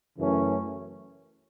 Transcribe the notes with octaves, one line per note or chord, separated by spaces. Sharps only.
F#2 C#3 E3 A3 C#4